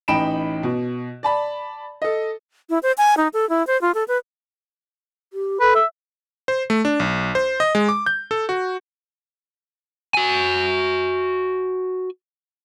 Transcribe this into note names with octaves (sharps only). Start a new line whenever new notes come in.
A1 D#4 G5 B5 D7 E7
B2
D5 A5 B5
A4 D#5
E4
C5
G#5
D#4
A4
E4
C5
F4
A4
B4
G4
A4 B4
E5
C5
A3
D4
B1
C5
D#5
G#3
D6
G6
A4
F#4
F#4 G#5